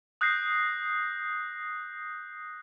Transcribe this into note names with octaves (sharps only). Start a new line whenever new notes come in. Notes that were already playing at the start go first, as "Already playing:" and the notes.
D#6 F#6 G6 A#6 C7